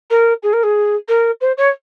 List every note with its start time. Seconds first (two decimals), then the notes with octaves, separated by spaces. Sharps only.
0.10 A#4
0.43 G#4
0.53 A#4
0.63 G#4
1.08 A#4
1.41 C5
1.57 C#5